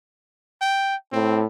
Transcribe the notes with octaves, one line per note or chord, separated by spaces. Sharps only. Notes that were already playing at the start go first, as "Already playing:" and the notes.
G5
A2 C4